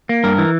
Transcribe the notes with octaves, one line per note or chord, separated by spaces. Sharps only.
A#3
G2 A#4
E3